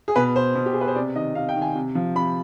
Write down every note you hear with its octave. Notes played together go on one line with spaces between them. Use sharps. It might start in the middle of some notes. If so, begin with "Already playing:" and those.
G#4
B2 B4
C5
B2
G4
G#4
B4
C5
C3 D5
D#3 D#5
C3 F5
G5
D#3
G#5
C3
F3
C3 B5